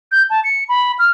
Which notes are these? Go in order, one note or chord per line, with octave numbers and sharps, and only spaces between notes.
G6
A5
C#7
B5
F6